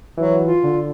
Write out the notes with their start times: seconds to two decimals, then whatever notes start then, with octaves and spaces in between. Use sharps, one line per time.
0.17 E3 F#3
0.44 F4
0.64 D3